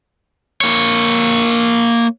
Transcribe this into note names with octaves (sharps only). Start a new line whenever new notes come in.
A#3 C#5